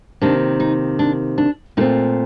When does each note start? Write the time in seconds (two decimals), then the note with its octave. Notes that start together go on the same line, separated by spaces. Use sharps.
0.21 C3 D#3 A#3 D4
0.60 D#4
0.99 D4
1.38 D4
1.77 A#2 A3 C4 D#4